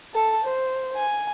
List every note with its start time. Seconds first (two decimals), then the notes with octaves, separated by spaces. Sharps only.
0.14 A4 A5
0.45 C5
0.96 G#5